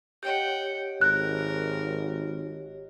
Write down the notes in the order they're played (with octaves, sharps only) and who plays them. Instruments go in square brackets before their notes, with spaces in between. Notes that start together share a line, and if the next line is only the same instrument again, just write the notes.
[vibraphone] G4 C#5 D#5 [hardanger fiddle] F#5 G5
[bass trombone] G#1 [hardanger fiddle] A#4 [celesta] F#6